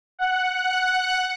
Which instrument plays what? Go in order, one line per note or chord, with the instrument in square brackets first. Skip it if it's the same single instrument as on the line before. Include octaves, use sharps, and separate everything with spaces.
[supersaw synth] F#5 F#6